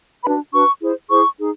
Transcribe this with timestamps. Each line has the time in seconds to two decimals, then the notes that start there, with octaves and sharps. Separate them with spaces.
0.23 D4 F#4 B4 B5
0.53 D4 F#4 B4 C#6
0.81 E4 G#4 C5
1.10 E4 G#4 C5 C#6
1.39 D#4 G#4